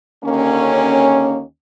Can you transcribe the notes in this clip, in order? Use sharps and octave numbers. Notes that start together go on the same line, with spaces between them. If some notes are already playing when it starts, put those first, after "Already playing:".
D#2 D3 A#3 C#4